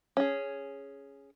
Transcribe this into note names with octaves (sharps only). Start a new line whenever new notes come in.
C#4 G#4